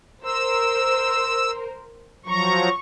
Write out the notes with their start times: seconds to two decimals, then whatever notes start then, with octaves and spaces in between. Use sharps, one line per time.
0.24 A#4 C5 E6
2.26 F3 F#3 A#5 C#6